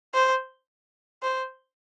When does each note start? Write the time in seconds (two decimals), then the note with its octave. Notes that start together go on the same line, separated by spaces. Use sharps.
0.14 C5
1.22 C5